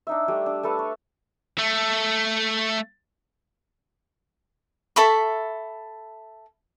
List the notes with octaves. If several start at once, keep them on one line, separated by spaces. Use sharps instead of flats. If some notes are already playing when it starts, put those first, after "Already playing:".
D4 D#4 E5
G3 A3 D4
D4
A3 A4 B4 A5
C#5
A3
A4 E5 B5 C#6